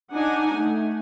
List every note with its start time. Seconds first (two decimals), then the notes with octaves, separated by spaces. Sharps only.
0.11 D4 D#4 F#5 G#5
0.56 A3